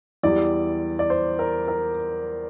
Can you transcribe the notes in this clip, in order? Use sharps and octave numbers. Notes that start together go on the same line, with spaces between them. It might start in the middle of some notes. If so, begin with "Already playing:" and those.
E2 E3 G3 D5
D5
C5
A#4
A#4